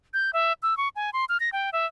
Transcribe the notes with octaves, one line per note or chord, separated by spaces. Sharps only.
G6
E5
E6
C#6
G#5
C6
F6
A#6
G5
E5